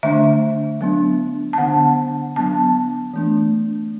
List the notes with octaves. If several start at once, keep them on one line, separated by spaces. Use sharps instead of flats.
D3 A3 D4 E5
F#3 B3 D4
A5
D3 B3 D4 F#5
F#3 B3 D4 A5
E3 A3 D4